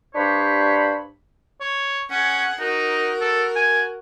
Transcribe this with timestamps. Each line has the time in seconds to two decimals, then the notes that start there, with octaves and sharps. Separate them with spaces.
0.15 G2 D4 G4 C5 C#5 B5
1.61 C#5
2.10 C#4 G#4 F#5
2.60 D#4 F#4 A#4
3.21 A4
3.56 G#5